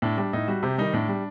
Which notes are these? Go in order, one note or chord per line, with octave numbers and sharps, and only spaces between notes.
A2 D4
G3 D4
A2 D#4
G3 F#4
C3 G4
D#3 G3 D#4
A2 D4
G3